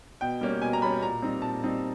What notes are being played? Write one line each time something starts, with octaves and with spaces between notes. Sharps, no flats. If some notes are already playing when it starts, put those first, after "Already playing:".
B2 G5
G3 A#3 C#4
B2 G#5
A#5
G3 A#3 C#4 B5
A#2 A#5
G3 C4 D#4
A#2 A5
G3 C4 D#4